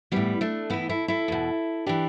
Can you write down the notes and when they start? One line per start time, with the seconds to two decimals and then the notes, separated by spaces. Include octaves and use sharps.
0.12 A2 E3 G3 B3
0.41 A3 D4
0.70 A2 E3 B3 E4
0.89 E4 A4
1.08 E4 A4
1.28 E2 B2
1.86 E3 D4 G4